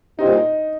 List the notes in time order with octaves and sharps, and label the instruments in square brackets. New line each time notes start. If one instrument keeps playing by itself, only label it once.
[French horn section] A#2 G3 C4 E4 G4 [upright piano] D#4